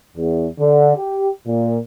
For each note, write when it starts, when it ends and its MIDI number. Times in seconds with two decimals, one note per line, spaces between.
0.17 0.46 40
0.58 0.94 50
0.96 1.27 67
1.46 1.77 46